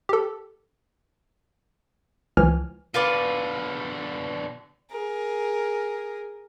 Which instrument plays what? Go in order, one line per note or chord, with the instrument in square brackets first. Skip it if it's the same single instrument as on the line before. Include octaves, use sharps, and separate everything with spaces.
[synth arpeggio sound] G4 A4
C#2 E3 F3 G#5 F6
[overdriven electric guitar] B2 D3 [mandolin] F4 B4 D5
[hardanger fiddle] G#4 A#4